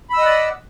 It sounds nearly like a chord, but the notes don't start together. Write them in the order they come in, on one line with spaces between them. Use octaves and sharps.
B5 E6 D#5 F#5 D5